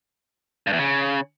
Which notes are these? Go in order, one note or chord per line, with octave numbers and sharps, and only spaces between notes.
G2
E2
C#3